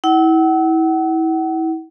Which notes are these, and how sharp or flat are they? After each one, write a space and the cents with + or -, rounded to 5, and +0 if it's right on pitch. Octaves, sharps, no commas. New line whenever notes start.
E4 -30 F#5 +35